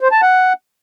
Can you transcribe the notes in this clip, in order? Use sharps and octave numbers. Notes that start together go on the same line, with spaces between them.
C5
A5
F#5